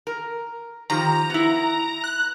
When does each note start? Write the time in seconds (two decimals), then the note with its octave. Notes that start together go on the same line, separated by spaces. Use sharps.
0.07 A#4
0.90 D#3 F3 G4 A#5
1.30 B3 E4
2.04 F#6